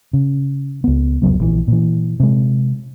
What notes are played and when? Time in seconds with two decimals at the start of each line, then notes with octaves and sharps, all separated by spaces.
0.13 C#3
0.84 C#2 B3
1.22 F1 C#2 F#3 B3
1.40 A#1 E3
1.68 A#2 E3
2.20 C3 G#3